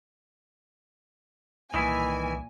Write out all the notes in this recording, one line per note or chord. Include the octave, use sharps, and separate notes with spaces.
C2 A#2 D#3 E3 E4 G#5